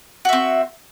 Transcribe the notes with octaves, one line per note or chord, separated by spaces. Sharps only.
C4 F#4 E5